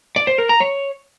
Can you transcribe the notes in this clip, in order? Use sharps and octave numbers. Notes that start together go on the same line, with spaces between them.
D5
C5
A#4
A#5
C#5